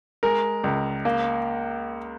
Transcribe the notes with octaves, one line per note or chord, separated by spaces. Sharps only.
G#3 A#4
C#2
A#3